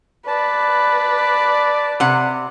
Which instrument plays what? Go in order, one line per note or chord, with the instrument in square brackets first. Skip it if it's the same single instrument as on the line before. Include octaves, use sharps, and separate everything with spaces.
[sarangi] B4 [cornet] D5 [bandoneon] A5
[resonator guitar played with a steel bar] C3 F#5